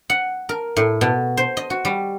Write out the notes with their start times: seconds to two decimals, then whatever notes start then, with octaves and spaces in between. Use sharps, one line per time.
0.10 F#5
0.49 A#4
0.77 A2
1.01 B2
1.37 C5
1.57 D#5
1.70 F#4
1.85 G3